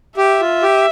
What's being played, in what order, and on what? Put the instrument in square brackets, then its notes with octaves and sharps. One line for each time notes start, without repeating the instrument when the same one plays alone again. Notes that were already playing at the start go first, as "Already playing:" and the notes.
[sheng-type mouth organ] G4 [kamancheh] E5
[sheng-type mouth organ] F4
G4